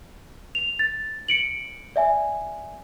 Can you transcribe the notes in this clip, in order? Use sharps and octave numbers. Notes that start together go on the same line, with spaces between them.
F7
A6
C#7 D7 F#7
D5 E5 G#5